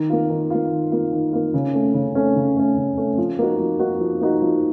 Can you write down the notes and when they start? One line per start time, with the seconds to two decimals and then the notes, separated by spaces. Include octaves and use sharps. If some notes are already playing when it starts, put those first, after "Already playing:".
Already playing: D#3
0.10 A#3 F4
0.30 D#3
0.50 A#3 F4
0.71 D#3
0.92 A#3 F4
1.12 D#3
1.33 A#3 F4
1.54 C#3
1.74 A3 C#4
1.94 C#3
2.15 A3 C#4
2.36 C#3
2.57 A3 C#4
2.77 C#3
2.97 A3 C#4
3.18 F3
3.39 A#3 D#4 F#4
3.59 F3
3.80 A#3 D#4 F#4
4.00 F3
4.21 A#3 D#4 F#4
4.42 F3